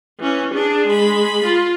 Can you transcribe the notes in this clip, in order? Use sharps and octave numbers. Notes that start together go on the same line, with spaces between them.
E3 C#4
D4 G#4
G#3 B5
F4